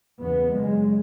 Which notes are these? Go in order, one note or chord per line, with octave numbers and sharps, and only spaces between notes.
E2 C#3 B3
F#2 C#3 G#3